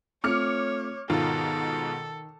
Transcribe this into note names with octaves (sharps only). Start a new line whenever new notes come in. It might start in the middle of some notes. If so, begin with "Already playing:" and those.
A3 C4 F4 C#5 D6 F6 C#7
G#2 B2 D#3 F4 A4